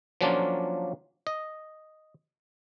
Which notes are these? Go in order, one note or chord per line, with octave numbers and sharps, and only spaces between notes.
F3 F#3 A#3 C#4 D4 F4
D#5